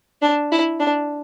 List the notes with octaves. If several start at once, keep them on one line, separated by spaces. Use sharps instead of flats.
D4
E4
D4